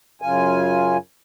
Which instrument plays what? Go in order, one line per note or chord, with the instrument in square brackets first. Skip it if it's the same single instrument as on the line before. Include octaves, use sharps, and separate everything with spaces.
[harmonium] F#2 C#3 F4 G#5